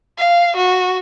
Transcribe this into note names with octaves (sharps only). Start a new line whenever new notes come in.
F5
F#4